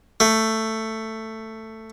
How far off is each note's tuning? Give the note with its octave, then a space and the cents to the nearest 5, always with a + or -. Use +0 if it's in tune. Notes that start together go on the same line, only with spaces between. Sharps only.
A3 +10